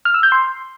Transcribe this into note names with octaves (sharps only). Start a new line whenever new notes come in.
F6
E6
G6
C6